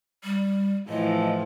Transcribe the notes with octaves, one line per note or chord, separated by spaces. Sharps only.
G3
A2 E3 F3 D#5